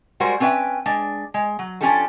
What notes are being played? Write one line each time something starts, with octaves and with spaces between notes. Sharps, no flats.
G3 G#3 F#4 A#4 C5
C4 C#4 B4 D5 E5 G5
G#3 D4
G#3
F#3
F3 C#4 D4 G4 A4 A5